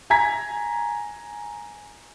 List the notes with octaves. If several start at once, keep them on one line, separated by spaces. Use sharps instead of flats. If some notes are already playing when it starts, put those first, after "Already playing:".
G#5 A#5 G#6 B6